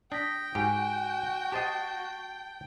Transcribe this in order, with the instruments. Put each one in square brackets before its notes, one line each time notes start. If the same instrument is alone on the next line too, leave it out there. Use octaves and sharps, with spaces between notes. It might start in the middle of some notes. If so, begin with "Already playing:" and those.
[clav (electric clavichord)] D4 [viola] G5 [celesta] D#6 A#6 B6
[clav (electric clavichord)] G#2 G4 [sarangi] F#4 [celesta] G#5 G6 D7
[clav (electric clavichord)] G4 C5 D#5 [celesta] A5 A6 C7